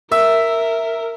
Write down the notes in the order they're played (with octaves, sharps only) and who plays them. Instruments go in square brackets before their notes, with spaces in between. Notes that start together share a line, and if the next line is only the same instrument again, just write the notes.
[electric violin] A#4 [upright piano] E5 E6